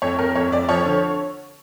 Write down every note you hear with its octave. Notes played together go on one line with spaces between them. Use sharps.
F2 C#5
F2 A#4
F2 C#5
F2 D5
F3 C#5
D3